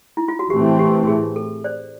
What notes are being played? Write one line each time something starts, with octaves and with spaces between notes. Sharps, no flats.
E4
F4
F#4
A2 E3 A3 C4 G4
G4
G#4
A4
C5 D5